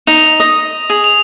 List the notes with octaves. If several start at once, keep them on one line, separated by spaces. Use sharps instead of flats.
D#4 F7
D#5
G#4
F7